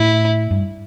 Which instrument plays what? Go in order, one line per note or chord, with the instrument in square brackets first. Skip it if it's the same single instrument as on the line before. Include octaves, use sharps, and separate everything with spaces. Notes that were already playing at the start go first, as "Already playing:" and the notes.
Already playing: [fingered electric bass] A2 [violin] E4
[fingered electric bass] G2